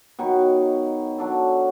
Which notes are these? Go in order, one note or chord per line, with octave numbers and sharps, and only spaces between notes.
B2 D#3 F#3 C#6
F#3 D4 A4